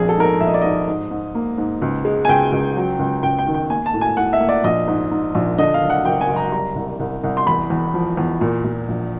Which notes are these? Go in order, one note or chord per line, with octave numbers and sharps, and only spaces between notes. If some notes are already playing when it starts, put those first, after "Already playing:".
Already playing: A#1 F2 G#4
A4
G#2 A#4
A4
A#1 E5
D#5
D5
G#2 D#5
G#2
G#2
A#3
G#2
C#2
G#3
G#5
C#2 G5
C#2
F#3
C#2
C#2 G5
G5
D#3
G5
A#3 G#5
A5
A2
G#5
A2 F#5
E5
A#3
D5
A#1 D#5
G#2
G#2
A#1
D3 D#5
F5
F#1
F#5
F#1 G5
G#5
F#1
A#5
G3 A#5
C2
C2
C2
C6
E2 B5
E2
F3
E2
A#2
A#2
A#1